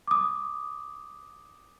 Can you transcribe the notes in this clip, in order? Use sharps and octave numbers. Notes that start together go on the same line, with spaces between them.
D6 D#6